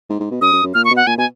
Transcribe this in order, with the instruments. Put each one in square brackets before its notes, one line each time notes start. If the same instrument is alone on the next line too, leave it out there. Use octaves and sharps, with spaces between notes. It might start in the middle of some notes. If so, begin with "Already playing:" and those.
[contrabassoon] G#2
G#2
B2
[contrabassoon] F#2 [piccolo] D#6
[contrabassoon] F#2
F#2
[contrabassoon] A#2 [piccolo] F6
[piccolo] C#6
[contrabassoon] B2
[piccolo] F#5
[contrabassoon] A#2 [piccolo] G#5
[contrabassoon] B2 [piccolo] G#5